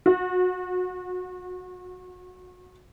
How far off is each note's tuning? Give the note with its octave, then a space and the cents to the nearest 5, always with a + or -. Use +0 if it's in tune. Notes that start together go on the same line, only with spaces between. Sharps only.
F#4 -25